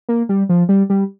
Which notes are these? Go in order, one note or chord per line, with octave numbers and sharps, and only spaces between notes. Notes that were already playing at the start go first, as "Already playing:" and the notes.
A#3
G3
F3
G3
G3